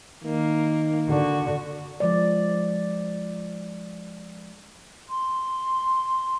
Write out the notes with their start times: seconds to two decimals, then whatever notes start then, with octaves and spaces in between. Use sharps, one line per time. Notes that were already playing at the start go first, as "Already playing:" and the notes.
0.24 D#3 A#3
1.08 D3 F#4
2.00 F3 G#3 D5
5.09 C6